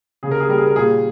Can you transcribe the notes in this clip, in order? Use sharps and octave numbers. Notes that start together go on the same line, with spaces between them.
C#3 G#4
A#4
G#4
G3 A#4
G#4
A#4
A#2 G#4